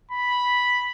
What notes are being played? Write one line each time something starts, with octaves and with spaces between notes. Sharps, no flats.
B5